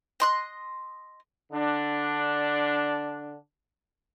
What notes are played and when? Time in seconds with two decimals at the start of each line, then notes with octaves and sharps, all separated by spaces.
0.20 D#5 C6 F#6
1.52 D3 D4